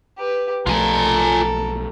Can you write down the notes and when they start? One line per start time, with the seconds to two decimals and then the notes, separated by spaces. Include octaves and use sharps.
0.18 G4 B4
0.67 B1 F3 A3 F4 A4 A#4 G#5